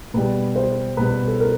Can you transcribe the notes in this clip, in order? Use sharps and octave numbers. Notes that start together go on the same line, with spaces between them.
B2 G3 B4
C5
B2 G3 B4
A4
A#4